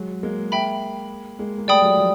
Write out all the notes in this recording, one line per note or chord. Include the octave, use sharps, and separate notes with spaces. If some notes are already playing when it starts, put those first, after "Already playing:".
Already playing: F#3 G#3
G#3 A#3
E5 G5 B5
G#3 A#3
A#3
G3 A3 D5 G5 B5 D#6
F#3 G#3
F3 G3